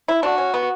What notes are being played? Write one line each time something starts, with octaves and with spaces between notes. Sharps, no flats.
E4
D4 F#4
C#4
B3